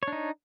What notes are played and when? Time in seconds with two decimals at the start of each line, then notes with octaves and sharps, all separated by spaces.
0.03 C#5
0.08 D4
0.13 D#4